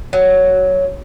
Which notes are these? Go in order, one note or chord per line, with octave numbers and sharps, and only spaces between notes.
F#3